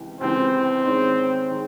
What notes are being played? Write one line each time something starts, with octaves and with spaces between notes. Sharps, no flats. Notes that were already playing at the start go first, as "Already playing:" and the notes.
Already playing: C#2 C3 E3
C#2 C3 E3 C4
G#2 D#3 G#3 C#4
D#3 G#3